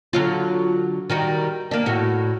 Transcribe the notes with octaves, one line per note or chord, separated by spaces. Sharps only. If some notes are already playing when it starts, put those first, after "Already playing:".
D3 F#3 F4
D#3 G3 F#4
A#3 D4
A2 F#4